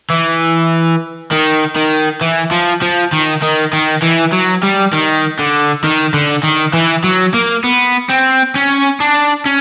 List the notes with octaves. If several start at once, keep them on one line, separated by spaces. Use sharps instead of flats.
E3
D#3
D#3
E3
F3
F3
D#3
D#3
D#3
E3
F#3
G3
D#3
D3
D#3
D3
D#3
E3
F#3
A#3
B3
C4
C#4
D4
C#4